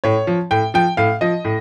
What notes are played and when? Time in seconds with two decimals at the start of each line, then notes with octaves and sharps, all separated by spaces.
0.04 A2 C#5
0.27 F3
0.51 A2 G5
0.74 F3 G5
0.97 A2 F5
1.21 F3 D#5
1.45 A2